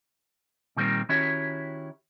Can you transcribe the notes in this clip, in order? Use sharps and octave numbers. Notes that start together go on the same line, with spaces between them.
A#2 D#3 G3 A#3 C4
D#3 C#4 E4 F#4 G4 C#5